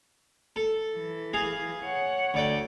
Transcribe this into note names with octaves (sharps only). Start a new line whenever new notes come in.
A4
E3
G#4 F5
C#5 F#5
D2 D5 G5